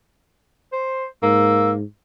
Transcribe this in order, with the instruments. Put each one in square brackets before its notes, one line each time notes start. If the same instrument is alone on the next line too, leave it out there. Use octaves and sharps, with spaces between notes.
[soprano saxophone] C5
[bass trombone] G#2 [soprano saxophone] A#3 [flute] E6